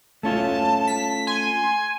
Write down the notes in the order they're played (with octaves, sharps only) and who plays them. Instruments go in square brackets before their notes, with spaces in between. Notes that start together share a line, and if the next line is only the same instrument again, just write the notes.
[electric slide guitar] A3 C#4 F4 [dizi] A5
[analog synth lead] B6
[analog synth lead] G#5 [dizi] C6